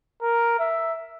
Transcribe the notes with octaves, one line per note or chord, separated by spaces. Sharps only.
A#4
E5